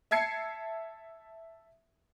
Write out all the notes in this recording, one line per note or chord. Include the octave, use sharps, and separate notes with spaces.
E5 A5 G#6 C7 C#7